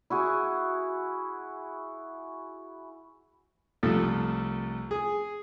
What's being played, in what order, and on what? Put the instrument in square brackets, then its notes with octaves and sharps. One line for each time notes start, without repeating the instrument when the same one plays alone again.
[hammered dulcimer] E4 F#4 G#4
[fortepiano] C2 F3 A3 A4
G#4